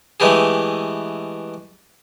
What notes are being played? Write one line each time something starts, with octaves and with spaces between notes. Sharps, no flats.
E3 G#3 A3 B3 G4 G#4